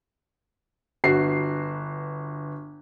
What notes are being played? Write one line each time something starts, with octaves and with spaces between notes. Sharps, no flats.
G1 F#4 B4 C7